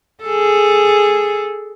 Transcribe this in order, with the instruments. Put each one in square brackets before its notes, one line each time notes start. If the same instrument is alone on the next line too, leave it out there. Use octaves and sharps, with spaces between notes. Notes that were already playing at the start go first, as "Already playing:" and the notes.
[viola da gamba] G#4 A4